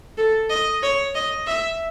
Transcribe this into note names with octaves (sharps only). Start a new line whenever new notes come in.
A4
D#5
C#5
D#5
E5